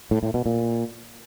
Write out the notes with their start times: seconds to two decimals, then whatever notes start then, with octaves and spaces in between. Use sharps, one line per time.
0.11 A2
0.23 A2
0.34 B2
0.46 A#2